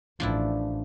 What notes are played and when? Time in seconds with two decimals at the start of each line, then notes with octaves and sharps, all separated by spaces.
0.20 A1 F3 D4 E4